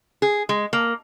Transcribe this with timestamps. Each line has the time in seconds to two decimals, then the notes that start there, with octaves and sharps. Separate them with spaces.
0.22 G#4
0.49 G#3
0.73 A#3